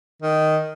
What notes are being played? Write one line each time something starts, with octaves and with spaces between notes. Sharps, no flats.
D#3